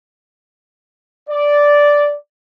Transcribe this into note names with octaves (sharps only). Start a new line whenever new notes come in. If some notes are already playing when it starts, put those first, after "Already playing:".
D5